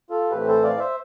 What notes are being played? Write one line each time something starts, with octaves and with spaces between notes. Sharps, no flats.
F4 A4
A2 E3 A3 C4 G4 B4
A4 C5
D5 F5
C5 E5